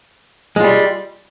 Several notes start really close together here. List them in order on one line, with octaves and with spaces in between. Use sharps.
G#3 F4 G3